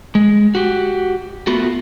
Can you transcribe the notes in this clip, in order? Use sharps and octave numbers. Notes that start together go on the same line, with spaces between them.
G#3
F#4 G4
A3 B3 F4 F#4